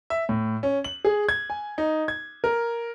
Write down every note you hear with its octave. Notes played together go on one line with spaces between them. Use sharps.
E5
A2
C#4
F#7
G#4
G#6
G#5
D#4
G#6
A#4